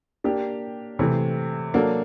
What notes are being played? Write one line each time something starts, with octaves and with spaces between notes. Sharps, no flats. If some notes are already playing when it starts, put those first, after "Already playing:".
A#3 D4 G4
C3 E3 A3
F#3 A#3 D4 F#4 A4